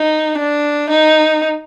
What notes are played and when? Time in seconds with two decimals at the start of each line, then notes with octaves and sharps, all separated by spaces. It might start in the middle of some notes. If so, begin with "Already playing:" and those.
Already playing: D#4
0.38 D4
0.90 D#4